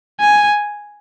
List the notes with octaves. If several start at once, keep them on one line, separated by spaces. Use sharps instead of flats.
G#5